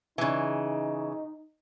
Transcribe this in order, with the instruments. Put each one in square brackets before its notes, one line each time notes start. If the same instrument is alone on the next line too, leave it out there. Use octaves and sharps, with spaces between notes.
[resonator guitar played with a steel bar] C#3 E3 [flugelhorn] D#4